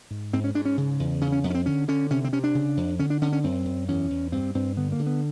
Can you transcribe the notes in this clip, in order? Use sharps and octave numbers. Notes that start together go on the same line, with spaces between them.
G#2
G#2 C4
C#4
G#2 D4
C#4
C#3
E2
C#3 C#4
C#4
F2 B3
C#4
C4
D3 C#4
D3 C#4
C3 C#4
C4
C3 C#4
D4
C#3
F2
D3 C#4
D4
D3 C#4
C#4
F#2 C4
F#2
E2 C#4
E2
G2 C4
G2 C4
D3 B3
A#3
D3
B3